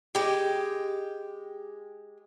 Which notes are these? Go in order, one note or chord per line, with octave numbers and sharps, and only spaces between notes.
G#3 G4